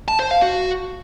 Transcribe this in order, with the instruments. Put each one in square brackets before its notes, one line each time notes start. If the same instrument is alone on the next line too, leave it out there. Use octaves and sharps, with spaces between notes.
[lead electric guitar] A5
C5
F5
F#4